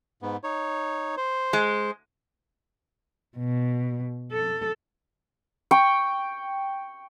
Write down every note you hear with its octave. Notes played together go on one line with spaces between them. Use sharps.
G#2 B3
D#4 C#5
C5
G#3
B2
A4
G5 C#6